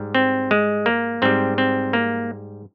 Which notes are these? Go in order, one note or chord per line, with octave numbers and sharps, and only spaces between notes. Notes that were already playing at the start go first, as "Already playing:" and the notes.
Already playing: G#2 G3
C4
G#3
A#3
G#2 G3 C4
C4
A#3